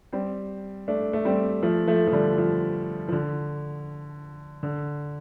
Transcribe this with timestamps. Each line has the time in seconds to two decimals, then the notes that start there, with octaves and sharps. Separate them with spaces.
0.12 G3 C4
0.88 A3 D4
1.13 A3
1.25 G3 C4
1.63 F3 A3
1.87 F3 A3
2.07 F3
2.12 D3 G3
2.38 F3
3.08 F3
3.12 D3
4.63 D3